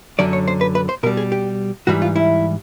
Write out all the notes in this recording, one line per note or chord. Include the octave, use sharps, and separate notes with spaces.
F#2 D3 F#3 D5
C#5
C5
B4
B4
C5
B2 G3 A#4
G#4
G4
G#2 E3 G3 F#4
F4
E4